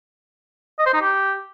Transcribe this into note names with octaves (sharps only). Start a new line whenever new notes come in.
D#5
C5
D#4
G4